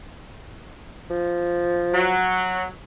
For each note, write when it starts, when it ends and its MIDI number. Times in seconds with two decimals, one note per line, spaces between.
1.10 2.17 53
1.93 2.70 54